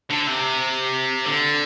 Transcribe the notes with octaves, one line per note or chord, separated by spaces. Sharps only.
D3
C3
D3